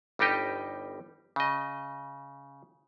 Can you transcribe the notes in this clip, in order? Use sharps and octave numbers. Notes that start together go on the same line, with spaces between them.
G1 G3 D#4 G4 D#5
C#3 D#5